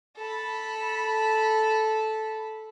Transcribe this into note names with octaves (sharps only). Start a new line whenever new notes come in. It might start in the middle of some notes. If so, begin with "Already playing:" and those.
A4 B5